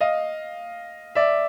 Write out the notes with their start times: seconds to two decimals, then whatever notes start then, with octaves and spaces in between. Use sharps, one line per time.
0.01 D#5 F5
1.15 D5 E5